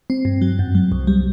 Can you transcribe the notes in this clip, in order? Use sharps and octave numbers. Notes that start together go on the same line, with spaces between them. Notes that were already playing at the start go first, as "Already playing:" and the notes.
C4
G2
F#3
F#2
F#3
C2
G3